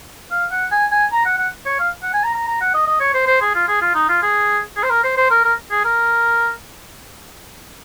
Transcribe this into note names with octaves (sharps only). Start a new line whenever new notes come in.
F5
F#5
G#5
G#5
A#5
F#5
F#5
C#5
F5
F#5
G#5
A#5
A#5
A#5
F#5
D#5
D#5
C#5
C5
C5
G#4
F4
G#4
F4
D#4
F4
G#4
G#4
C5
A#4
C5
C5
A#4
A#4
G#4
A#4